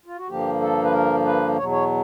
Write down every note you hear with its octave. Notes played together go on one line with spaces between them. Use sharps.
F4
F#4
G2 D3 F3 A#3 G4
A4
B4
A#4
B4
E2 B2 F#3 C#5
C#5